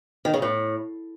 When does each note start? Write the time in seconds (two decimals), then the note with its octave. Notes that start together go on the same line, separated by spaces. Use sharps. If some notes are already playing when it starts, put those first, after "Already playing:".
0.25 D#3
0.34 C#3
0.42 A2